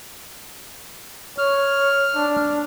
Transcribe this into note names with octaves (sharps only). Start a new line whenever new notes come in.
C#5 F6
D4